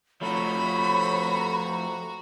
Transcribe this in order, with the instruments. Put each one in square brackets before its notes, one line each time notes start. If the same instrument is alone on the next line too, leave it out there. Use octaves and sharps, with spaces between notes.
[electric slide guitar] F3 A3 [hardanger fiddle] F#4 A#5 [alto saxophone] C#5 [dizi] B5